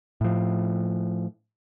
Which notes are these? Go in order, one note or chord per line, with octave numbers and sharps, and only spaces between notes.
A2 F3